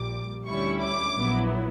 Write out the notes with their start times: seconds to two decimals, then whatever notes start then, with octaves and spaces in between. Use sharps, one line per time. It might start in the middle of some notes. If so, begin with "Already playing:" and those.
Already playing: A#1 A#2 G3 D6
0.47 D2 D3 G3 C#4 E4 C#6
0.82 D6
1.17 A#1 A#2 F#3 B3 E4